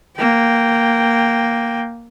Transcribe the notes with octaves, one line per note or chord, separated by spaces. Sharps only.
A#3 G5